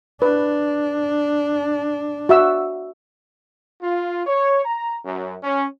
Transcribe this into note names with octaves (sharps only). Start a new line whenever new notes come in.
D4 B4
F#4 E5 E6
F4
C#5
A#5
F#2
C#4